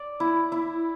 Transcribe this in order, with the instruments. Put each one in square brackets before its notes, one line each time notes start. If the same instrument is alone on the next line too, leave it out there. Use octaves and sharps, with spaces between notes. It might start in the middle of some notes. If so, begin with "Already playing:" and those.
Already playing: [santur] D5
E4
E4